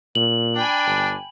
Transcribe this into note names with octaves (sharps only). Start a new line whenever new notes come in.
A#2 F#7
D4 G5 G#5 B5
G1